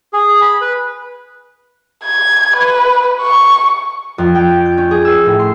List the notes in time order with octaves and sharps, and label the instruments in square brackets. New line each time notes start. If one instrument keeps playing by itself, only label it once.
[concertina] G#4
B5
B4
[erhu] G#6
B4
C#6
[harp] F2
G5
D7
G6
C#4
G#4
E6
A2
C6